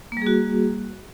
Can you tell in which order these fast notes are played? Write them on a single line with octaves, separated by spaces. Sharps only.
A#3 G3 G#4 F#4